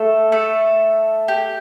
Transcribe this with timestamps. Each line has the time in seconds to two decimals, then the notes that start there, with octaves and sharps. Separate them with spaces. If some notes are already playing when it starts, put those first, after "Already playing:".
Already playing: A3 A4
0.32 A3 A4
1.28 G4